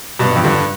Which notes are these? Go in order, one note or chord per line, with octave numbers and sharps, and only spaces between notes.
G2 B2
F2
G2 D3